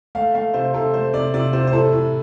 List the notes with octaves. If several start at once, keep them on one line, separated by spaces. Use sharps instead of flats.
A3 F5
A3 F5
C3 C5
C3 A4
A3 C5
C3 D5
C3 D5
C3 C5
C5
A2 A4
A2